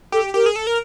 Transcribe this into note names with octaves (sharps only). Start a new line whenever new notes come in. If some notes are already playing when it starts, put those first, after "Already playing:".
G4 A4
G4 A#4
G#4
A4
A#4